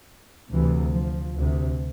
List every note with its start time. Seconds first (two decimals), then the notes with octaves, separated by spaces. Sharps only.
0.52 D2 C3 E3
0.94 F3
1.35 D2 C3